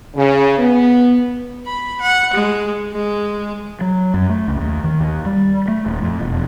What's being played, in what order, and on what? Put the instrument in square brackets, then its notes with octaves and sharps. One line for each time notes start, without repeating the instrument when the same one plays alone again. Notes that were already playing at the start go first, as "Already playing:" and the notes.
[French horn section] C#3
B3
[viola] B5
F#5
G#3
G#3
[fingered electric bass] F#3
F#2
A3
C#2
D#2
D#3
D#2
G3
A3
D#1
F2
E1